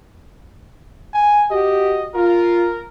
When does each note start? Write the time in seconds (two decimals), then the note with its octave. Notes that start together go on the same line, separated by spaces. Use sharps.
1.14 G#5
1.51 F#4 G4 D#5
2.15 F4 A#4